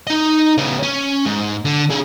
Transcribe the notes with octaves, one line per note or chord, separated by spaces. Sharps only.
D#4 D#5
C#3 B3
C#4
G#2
D3
D3 G#4